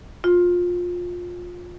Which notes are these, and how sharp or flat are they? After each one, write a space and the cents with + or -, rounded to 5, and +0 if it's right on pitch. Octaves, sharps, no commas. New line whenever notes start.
F4 +20